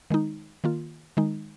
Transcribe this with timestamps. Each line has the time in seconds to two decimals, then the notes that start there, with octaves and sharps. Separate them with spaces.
0.10 D#3 G#3 D#4
0.64 D#3 A#3 F4
1.17 D#3 G#3 D#4